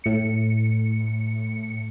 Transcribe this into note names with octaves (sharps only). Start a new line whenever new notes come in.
A2 C#7